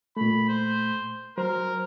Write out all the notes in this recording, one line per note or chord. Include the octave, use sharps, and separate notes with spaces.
A#2 A3 B5
C5
F#3 A#4 C5